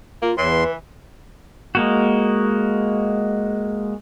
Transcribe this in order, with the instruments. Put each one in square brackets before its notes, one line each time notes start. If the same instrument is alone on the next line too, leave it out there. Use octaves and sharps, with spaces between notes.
[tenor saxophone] A#3 [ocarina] F4
[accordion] E2 C6 [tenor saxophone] E3 [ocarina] C#5
[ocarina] B4
[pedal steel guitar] G#3 A#3 F#4